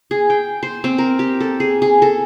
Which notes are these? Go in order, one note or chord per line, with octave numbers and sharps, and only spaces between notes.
G#4
G5
C5
C4
A#4
G4
A4
G#4
G#4
A4